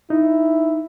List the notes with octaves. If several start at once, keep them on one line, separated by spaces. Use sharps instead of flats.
D#4 E4